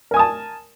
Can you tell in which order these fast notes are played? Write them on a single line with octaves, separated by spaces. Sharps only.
A#4 G#5 D#6 A5